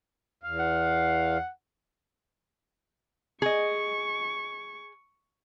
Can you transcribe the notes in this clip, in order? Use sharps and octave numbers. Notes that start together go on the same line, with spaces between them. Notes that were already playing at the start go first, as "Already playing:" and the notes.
E2 F5
F#5
G#4 D#5 C#6